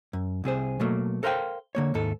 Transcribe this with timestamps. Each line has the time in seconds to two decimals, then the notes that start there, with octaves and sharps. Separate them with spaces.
0.13 F#2
0.44 C2 C3 G#4 C5
0.80 B2 F#3 A3 A#3
1.23 A4 A#4 C5 E5 F5 G5
1.75 D3 A#3 C#5
1.94 D#2 G#2 A4